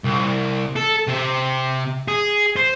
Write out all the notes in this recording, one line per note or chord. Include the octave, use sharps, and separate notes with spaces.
C2
A4
C3
G#4
C5